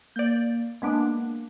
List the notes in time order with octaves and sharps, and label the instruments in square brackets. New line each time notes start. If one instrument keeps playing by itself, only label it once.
[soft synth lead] A#3 [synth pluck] D5 G6
[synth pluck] G#3 B3 D4 [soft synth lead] A#3